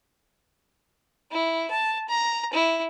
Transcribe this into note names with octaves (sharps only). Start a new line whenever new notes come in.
E4
A5
A#5
E4